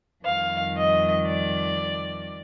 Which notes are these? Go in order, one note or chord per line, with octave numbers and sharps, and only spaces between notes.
F2 D#3 G3 F5
D#5
D5